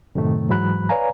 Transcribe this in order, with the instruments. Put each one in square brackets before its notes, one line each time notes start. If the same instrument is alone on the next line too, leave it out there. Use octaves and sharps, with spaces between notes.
[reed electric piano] F#2 A2 C3 D#3 A3
G#2 E3 F#3 B5 F#6
B4 C#5 D5 F5 G#5 A#5